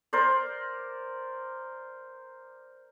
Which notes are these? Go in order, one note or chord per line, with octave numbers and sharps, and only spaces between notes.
A#4 C5 D5